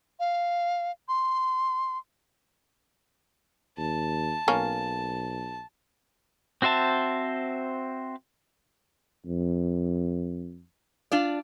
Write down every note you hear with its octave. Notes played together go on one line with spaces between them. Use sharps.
F5
C6
D#2 A5
B1 A#3 C#4
C4 F#4 C5 E5 A5
F2
D4 F4 D5